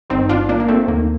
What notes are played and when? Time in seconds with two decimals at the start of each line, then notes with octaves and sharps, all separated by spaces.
0.10 G1 G2 D#3 C4 D#4
0.29 D4 F4
0.49 A#3 D4
0.60 A#3
0.68 A3 C4
0.88 D#2 D#3 A#3